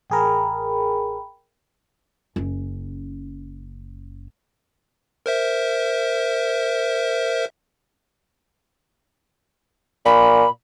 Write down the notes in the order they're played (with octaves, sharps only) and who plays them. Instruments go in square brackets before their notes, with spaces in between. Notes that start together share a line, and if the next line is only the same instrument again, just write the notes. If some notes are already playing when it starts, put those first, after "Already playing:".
[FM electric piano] A1 G#4 A#4 [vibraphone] G5 B5
[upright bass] F#1 C#4
[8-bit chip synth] A#4 C5 E5
[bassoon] A#2 [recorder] B5